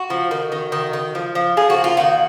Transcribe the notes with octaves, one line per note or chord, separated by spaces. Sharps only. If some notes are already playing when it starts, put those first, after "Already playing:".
Already playing: F#4
F3
D#3
D#3
D#3
D#3
F3
F3
F3 G#4
F#4
A#3
F4
D#3 F#4